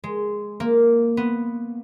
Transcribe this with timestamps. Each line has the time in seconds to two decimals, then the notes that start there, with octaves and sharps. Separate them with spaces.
0.04 G#3
0.60 A#3
1.17 B3